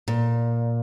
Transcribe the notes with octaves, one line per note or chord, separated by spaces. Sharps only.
A#2